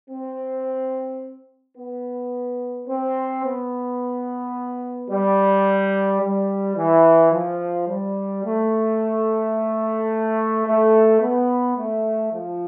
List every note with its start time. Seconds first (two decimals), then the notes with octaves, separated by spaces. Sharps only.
0.10 C4
1.78 B3
2.88 C4
3.44 B3
5.11 G3
6.23 G3
6.77 E3
7.32 F3
7.89 G3
8.45 A3
10.67 A3
11.22 B3
11.77 A3
12.33 F3